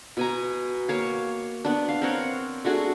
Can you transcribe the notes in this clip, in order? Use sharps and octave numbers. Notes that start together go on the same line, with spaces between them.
B2 G#5 A#5
A#3 C#5 F5
B3 D4
F5
C4 A#4 C#5 F#5
A3 D4 F#4 G#4